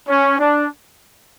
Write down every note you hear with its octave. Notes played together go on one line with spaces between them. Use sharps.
C#4
D4